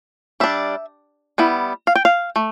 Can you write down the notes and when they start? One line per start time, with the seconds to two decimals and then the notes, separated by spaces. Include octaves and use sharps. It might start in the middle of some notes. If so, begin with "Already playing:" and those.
0.40 G3 D4 E5
1.38 G3 B3 E4
1.87 F5
1.95 G5
2.05 F5
2.36 A3